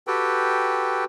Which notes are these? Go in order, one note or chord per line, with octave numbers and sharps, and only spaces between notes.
F#4 G4 A4 B4 G5